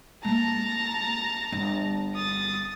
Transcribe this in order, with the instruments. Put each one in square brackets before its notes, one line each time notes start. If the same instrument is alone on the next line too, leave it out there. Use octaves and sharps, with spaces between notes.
[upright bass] G#3 A#3 [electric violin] A5 A#5
[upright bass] G1
[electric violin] D#6 A6